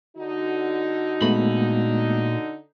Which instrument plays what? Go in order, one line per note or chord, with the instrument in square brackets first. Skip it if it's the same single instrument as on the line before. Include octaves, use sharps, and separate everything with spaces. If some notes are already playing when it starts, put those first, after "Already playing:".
[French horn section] D3 D#4 [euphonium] F#4
[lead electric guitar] A#2 B5 [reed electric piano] G#3 A3 B3